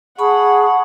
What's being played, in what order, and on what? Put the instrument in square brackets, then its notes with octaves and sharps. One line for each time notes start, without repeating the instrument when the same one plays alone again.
[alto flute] G#4 [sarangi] F#5 [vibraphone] A5 B5 C#6